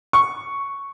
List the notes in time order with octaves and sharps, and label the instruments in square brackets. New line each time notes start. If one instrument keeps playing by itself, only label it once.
[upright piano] C#6